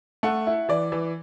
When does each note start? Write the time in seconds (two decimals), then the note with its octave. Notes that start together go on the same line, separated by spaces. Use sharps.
0.23 A3 F#5
0.47 E4
0.69 E3 D5
0.92 E3